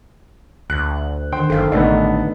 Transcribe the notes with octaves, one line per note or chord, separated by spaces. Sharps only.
D2 F#6
D3 D#3 C5 G5 C6
F#1 A4 F5
A1 D3 A3 B3 D#4